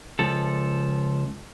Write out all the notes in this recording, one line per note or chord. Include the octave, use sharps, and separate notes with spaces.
C#2 F3 A4